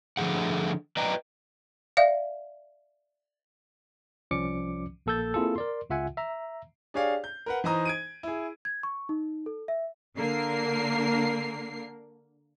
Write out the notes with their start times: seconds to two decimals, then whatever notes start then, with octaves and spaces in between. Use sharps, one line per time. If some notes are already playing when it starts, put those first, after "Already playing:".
0.17 D3 F3 A3 G#4 F#5
0.97 B4 D5 D#5 G5 A#5
1.97 D5 E5 F5
4.31 C2 F3 C#4 D5 D6 C#7
5.06 A#1 A#3 A4 E6 G6 A6
5.34 A#3 C4 E4 F4 G#4 A4
5.56 A#4 D5 C6
5.90 C#2 C#3 F4 E5 F#5 G#5
6.17 E5 A#5
6.94 D4 G4 G#4 C#5 D5 F5
7.24 G6
7.46 A#4 B4 F#5
7.64 E3 D#4 C5 A#5 D#6
7.85 G#6 D7 D#7
8.23 E4 G#4
8.65 G#6
8.83 C#6
9.09 D#4
9.46 A4
9.68 E5
10.17 D3 A#3 A#4 C7